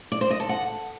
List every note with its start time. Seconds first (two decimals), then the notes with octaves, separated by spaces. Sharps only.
0.12 D5
0.21 C5
0.30 D#5
0.40 A4
0.49 F#5